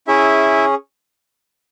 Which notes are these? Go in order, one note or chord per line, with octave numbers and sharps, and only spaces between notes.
C#4 E4 G#4 E5